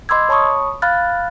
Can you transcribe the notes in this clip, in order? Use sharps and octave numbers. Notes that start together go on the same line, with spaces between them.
D#5 B5 C6 D6 E6 G#6
C#5 A5 B5 C#6 D#6
F5 B5 F6 F#6 A6